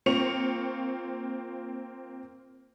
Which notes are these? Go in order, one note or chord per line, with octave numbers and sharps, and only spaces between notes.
A#3 C4 F4 C#6 C#7 F7